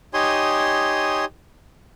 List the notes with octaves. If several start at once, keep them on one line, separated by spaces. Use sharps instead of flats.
D#4 G4 C#5 G#5 C6 D#6